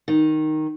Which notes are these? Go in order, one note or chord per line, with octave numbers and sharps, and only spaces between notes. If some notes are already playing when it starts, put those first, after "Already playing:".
D#3